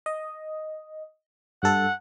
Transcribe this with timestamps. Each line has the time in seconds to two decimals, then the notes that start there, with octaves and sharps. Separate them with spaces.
0.06 D#5
1.63 G2 A4 F#5